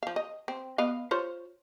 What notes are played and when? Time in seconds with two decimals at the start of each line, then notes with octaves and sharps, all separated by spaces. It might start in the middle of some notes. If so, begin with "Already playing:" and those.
0.03 F3 F5
0.16 D#5
0.48 C4
0.78 B3 D#5 F5
1.11 F4 C5 C#5